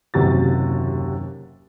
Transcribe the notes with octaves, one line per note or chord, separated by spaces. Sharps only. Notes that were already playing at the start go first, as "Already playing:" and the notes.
F#1 D#2 C3 F#4 A6